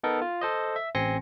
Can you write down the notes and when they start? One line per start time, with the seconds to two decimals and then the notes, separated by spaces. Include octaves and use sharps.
0.03 B3 D#4 A4 A#4
0.22 F4
0.41 A4 C5 D#5
0.76 E5
0.95 A1 C4 G#5 C6 A#6 C#7